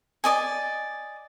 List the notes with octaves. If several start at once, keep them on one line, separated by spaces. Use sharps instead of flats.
D5 D#5 G#5